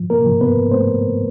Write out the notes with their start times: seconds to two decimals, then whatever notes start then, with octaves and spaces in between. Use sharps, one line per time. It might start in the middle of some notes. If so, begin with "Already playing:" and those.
Already playing: F3
0.10 A#3 A#4
0.26 F3
0.41 B3 B4
0.72 A3 C4 C5